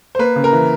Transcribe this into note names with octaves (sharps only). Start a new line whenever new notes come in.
C5
A#3 B4
C#3
A#4
E3